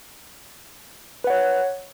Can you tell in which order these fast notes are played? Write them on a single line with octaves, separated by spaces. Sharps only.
B4 F#5 C#5